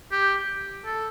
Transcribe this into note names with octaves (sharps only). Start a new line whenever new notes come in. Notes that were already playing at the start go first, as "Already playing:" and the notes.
G4
A4